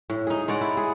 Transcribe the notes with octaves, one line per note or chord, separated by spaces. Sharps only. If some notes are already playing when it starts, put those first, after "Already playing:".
A2
D#4 G#4
G#3 C#5 D5 F#5
E4
G#4